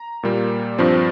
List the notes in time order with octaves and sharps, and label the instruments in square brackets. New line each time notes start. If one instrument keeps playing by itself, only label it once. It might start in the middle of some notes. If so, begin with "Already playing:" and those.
Already playing: [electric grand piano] A#5
A#2 G3 A#3
G2 F3 C4